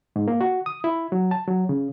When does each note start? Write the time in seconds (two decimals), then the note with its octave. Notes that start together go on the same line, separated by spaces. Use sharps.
0.16 G#2
0.28 A#3
0.41 F#4
0.66 D#6
0.84 E4
1.12 F#3
1.31 A5
1.47 F#3
1.69 C#3